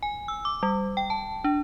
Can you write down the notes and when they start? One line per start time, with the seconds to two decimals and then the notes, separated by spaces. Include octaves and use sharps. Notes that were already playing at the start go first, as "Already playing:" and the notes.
0.03 G#5
0.28 E6
0.45 D6
0.63 G3
0.97 G5
1.10 A5
1.44 D4